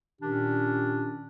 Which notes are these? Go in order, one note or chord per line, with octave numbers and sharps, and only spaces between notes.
A#2 D#3 C#4 D4 G4